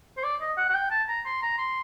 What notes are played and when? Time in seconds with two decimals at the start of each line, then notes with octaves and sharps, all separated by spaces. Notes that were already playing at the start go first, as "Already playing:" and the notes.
0.17 C5
0.24 D5
0.41 D#5
0.57 F#5
0.69 F#5
0.74 G5
0.91 A5
1.08 A#5
1.25 C6
1.42 A#5
1.58 C6